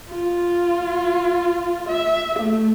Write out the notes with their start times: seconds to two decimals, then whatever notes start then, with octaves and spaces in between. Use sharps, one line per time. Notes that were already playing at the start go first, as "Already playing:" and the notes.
0.10 F4
1.89 E5
2.39 A3